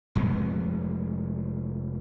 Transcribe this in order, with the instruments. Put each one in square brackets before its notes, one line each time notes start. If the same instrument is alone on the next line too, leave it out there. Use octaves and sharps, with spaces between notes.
[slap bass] F1 F2 G#3 B3